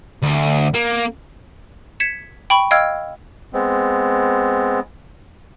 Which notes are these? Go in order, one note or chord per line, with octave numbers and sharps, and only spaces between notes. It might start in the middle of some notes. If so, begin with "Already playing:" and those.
D2
A#3
G#6 B6 C#7 E7
G5 B5 C#6
D#5 F5 G5 E6 F6 G#6
G#3 B3 C4